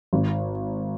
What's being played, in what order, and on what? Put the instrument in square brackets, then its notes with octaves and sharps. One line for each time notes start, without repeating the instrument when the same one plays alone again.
[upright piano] G#1